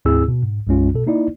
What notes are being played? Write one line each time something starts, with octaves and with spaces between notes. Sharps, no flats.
D2 G#2 C4 E4 G#4 E6
B2
G#2
B1 F#2 G#3 C#4 F4
B2 A4
A#3 D#4 E4 D5